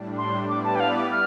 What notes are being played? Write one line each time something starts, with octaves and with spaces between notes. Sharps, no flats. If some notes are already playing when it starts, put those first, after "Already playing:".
Already playing: A2 G3 D4
C6
G3 B3 E4 B4 D5 D6
A5
G5
F5
D6
F6